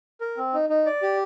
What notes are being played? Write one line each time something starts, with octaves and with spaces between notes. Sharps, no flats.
A#4
C4
D#4
D#4
D5
G4